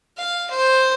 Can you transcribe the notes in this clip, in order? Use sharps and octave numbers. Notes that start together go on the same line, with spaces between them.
F5
C5